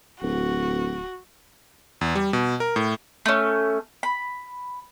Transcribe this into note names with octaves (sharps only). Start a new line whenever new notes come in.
D1 F#4
E2
G3
B2
A#4
A2
A3 C#4
B5